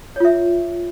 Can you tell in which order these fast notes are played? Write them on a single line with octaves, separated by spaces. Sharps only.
C#5 F4 E5